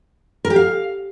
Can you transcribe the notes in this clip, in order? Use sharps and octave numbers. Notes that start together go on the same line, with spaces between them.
A#4
G4
F5